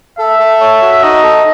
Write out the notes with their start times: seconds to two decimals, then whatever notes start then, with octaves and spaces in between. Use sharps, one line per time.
0.19 A4 E5
0.39 A4
0.60 C#5
0.82 F#4
1.03 D#4 D#5
1.23 A4